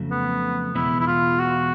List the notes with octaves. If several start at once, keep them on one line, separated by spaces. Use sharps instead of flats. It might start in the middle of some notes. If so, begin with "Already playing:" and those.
Already playing: F2 C#3 F#3 A3
B3
E2 B2 G#3 B3 E4
E4
F4
F#4